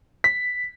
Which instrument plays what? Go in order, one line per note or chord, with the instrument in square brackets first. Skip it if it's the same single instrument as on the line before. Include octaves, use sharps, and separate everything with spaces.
[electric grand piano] B6